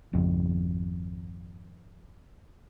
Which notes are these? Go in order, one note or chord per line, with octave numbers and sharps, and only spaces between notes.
G#1 F2